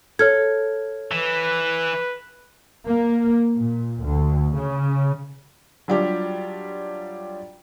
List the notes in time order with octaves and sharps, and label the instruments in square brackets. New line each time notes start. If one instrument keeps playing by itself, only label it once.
[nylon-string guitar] A4 [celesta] C#5 F6 G#6
[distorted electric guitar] E3 [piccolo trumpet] B4
[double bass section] A#3
A#2
D2
C#3
[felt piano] F#3 G3 D4 F4 G4